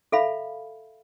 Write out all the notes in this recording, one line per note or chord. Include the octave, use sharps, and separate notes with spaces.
A4 E5 F5 B5